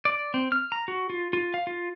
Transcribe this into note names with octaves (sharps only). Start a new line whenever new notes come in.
D5
C4
F6
A#5
F#4
F4
F4
F5
F4